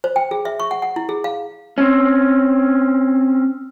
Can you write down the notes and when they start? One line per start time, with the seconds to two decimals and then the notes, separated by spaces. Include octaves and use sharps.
0.04 C5
0.16 G5
0.31 G#4
0.45 E5
0.60 C#6
0.71 F#5
0.82 F#5
0.96 E4
1.09 G#4
1.24 F5
1.78 C4 C#4